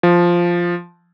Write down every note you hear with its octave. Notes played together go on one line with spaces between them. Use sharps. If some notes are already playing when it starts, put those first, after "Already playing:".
F3